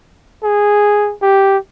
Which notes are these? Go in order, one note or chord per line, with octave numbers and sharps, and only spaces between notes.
G#4
G4